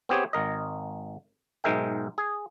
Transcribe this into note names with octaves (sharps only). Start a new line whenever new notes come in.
B3 C4 G4 G#4 C#5
G#1 A#4 D#5
B1 G#2 G#3 A#4 E5 G5
G#4